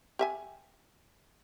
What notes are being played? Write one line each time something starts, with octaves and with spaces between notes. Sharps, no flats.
G4 E5 G#5